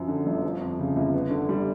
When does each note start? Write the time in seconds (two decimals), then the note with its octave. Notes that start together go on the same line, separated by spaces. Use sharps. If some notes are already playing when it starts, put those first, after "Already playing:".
Already playing: F#2 F3
0.08 D3
0.26 G1
0.43 F3
0.61 F2
0.79 C#3
0.96 G1
1.14 B3
1.30 D3
1.49 G3